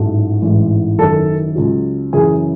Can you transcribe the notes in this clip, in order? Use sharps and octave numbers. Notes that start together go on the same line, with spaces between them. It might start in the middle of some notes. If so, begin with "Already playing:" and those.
Already playing: A1 G#2 F#3 A3
A1 G#2 E3 G#3
F#1 F#2 D#3 A4 A5
C#2 C#3 F#3
F#2 C#3 E3 G#4 G#5